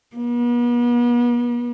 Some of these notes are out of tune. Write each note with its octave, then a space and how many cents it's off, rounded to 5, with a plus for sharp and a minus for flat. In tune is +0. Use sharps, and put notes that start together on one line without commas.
B3 -40